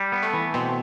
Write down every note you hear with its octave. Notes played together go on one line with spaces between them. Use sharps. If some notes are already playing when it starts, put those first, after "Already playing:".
Already playing: G3
B3
A3
E3
B2 C4